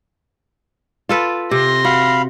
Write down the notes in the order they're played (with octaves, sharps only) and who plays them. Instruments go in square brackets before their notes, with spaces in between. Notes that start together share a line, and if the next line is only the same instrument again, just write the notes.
[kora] F4 A4 B4
[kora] C3 [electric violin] C6 A#6
[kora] F#4 [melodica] F5 B5